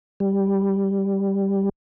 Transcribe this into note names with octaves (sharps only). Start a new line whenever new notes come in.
G3